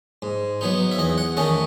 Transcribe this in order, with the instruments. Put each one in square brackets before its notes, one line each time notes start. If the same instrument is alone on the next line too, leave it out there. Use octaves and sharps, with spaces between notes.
[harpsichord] G#2
F#3 B3 D#4
E5
E2 D#5
F#5
D#3 A3 C#4 D#5